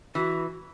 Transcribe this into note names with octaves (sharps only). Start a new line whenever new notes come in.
E3 F#4